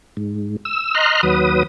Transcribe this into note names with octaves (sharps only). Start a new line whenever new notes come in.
G#2
E6
D#5 A#5 C6 F6 F#6
D#2 F#3 B4 D#6